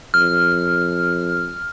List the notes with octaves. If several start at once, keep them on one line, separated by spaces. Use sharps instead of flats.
F2 F6